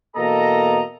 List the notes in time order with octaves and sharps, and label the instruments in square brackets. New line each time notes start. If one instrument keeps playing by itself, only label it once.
[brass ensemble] E2 B2 A#3 A4 D#5 A#5